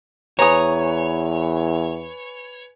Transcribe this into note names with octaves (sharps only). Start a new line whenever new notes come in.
E2 B4 C#5 G#5 A#5 D#6